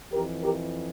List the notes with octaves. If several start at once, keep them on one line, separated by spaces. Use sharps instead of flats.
F2 E3 G4 A#4
G4 A#4